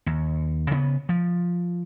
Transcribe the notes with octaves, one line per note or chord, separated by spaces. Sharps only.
D#2
C#3 B3
F3